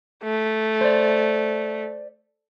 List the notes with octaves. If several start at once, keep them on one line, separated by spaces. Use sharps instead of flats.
A3
C5 D5